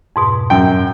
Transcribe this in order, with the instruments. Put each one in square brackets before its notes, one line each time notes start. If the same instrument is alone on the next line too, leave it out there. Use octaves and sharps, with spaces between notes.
[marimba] F2 G#2 B2
[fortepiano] F#2 G5